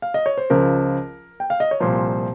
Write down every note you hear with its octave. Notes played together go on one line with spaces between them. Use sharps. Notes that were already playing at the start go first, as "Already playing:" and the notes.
F5
D#5
C#5
C5
C#2 C#3 F3 A#4
G5
F5
D#5
C#5
C2 A#2 F3 C5